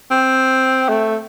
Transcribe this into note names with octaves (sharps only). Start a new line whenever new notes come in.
C4
A3